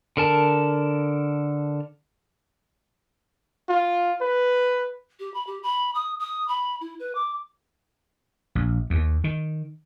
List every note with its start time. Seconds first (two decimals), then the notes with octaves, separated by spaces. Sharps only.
0.17 D3 A#4 A5
3.69 F4
4.21 B4
5.20 G4
5.34 B5
5.47 G4
5.63 B5
5.95 D#6
6.20 D#6
6.48 B5
6.81 E4
7.00 B4
7.15 D6
8.55 A#1
8.90 D#2
9.24 D#3